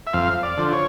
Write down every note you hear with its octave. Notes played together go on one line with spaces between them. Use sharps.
E5
F2 F5
D5
D3 F3
C#5